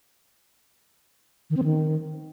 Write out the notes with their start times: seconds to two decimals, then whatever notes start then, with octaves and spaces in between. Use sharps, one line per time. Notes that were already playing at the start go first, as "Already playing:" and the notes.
1.50 D#3
1.57 C4
1.64 D#3